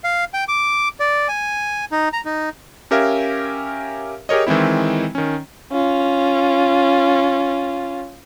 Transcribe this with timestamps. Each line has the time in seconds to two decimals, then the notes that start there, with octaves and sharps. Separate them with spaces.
0.04 F5
0.34 G5
0.48 D6
1.00 D5
1.28 G#5
1.92 D#4
2.13 A#5
2.25 D#4
2.91 C#4 G4 A#4 E5 F5 G#5
4.29 G4 G#4 A#4 C#5 D#5
4.47 D#3 E3 G#3 C4 E4
5.15 D#3 C#4
5.72 C#4 F4